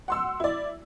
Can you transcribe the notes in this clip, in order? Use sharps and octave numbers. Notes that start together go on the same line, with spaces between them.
F#5 C6 E6
E4 D5